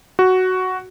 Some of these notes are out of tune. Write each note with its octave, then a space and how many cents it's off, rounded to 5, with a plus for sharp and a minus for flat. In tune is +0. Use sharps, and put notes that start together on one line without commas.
F#4 +5